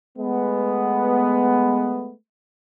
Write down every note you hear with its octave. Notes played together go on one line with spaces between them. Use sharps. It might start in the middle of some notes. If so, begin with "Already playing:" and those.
G#3 A3 B3